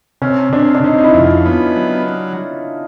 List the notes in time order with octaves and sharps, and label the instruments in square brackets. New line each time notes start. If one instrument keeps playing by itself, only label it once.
[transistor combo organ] C3 [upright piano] C#4
[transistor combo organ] C3 [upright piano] D4
[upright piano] D4
[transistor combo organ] C3 [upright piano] D#4
[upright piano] D#4
E4
[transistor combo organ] F2
[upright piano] F4
[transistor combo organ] B3
F#3